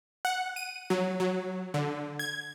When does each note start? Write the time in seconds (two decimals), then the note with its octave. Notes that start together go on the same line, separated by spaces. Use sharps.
0.25 F#5
0.56 D#7
0.90 F#3
1.20 F#3
1.74 D3
2.19 G#6